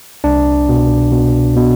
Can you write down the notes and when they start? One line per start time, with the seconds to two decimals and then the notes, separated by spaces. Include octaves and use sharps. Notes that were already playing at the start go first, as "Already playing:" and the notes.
0.24 C2 D4
0.69 B2
1.12 B2
1.57 B2